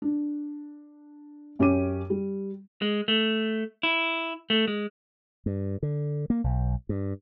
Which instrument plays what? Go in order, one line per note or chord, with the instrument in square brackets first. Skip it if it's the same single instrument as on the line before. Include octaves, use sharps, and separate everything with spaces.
[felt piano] D4
F#2 C#4 G4 D6 D#7
G3
[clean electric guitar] G#3
A3
E4
A3
G#3
[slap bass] G2
D3
A#3
B1
G2